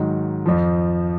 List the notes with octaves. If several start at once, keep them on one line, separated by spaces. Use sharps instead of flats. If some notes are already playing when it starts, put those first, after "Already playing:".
Already playing: G#2 D#3 F#3
F2 F3